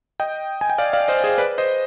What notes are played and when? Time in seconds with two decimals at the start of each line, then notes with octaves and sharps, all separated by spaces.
0.20 D#5 G5
0.61 G#5
0.70 G5
0.78 D5 F5
0.93 D5 F5
1.08 C5 D#5
1.24 G#4 C5
1.38 B4 D5
1.58 C5 D#5